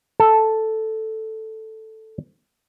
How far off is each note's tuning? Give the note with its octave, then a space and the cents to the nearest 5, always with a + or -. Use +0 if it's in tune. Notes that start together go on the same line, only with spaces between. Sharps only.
A4 +0